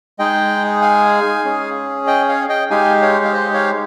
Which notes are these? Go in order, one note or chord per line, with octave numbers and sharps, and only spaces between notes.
G#3 D#4 G#4 D#5 G5
F5 G#5
C#4 G#4
D#5 G5
C#5 F5
D#5 G5
G#3 D#4 G4 F5 G#5
C#5 F5
F5
C5 D#5
C#5 F5